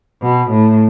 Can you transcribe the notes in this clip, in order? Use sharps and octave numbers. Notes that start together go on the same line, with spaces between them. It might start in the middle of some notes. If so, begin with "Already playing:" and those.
B2
A2